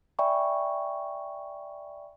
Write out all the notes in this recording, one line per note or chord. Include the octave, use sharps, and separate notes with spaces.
D5 E5 G5 G#5 B5 C#6